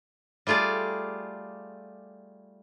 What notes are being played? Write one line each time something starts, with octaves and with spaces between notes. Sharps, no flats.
G3 A3 F4 G#4 D5